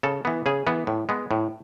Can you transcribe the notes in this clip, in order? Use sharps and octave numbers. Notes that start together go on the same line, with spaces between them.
C#3 A4
E3 B3
C#3 G#4
E3 B3
A2
G#3 B3
A2